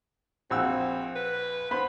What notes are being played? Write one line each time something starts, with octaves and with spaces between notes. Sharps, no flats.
A#1 C4 F#4 E6
B4
B3 C5 B5